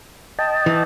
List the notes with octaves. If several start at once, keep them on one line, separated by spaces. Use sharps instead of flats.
D#5 G5 A5
E3